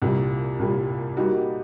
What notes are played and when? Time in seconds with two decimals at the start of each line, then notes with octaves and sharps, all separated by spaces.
0.02 C2 A#2 G3
0.59 C2 A#2 G3
1.17 G3 A#3 D#4 F#4